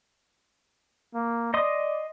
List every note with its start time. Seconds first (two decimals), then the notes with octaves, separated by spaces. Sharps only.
1.14 A#3
1.54 D5 D#5 C6 D#6